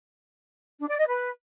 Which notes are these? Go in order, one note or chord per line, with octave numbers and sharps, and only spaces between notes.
D4
D5
D#5
B4